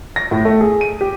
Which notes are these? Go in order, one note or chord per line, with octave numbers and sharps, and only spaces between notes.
A#6
A2
A3
G#4
D#7
G4